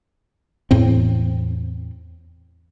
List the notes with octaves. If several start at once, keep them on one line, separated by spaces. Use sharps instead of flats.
E2 A2 C4